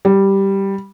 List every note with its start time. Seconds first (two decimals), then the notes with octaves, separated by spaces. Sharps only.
0.05 G3